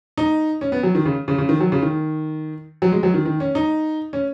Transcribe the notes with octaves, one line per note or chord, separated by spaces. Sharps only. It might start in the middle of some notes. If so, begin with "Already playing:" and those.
D#4
C#4
B3
F#3
D#3
C#3
C#3
C#3
D#3
F#3
C#3
D#3
F#3
G#3
F#3
D#3
D#3
C#4
D#4
C#4